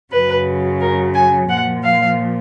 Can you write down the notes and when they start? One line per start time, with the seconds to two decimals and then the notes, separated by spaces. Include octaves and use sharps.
0.12 F#2 C#3 F#3 B4
0.80 A#4
1.14 G#5
1.49 A#2 F3 F#5
1.83 F5